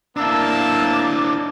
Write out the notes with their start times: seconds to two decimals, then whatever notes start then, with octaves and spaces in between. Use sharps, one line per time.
0.16 A#3 D4 E4 A5 E6
0.92 D6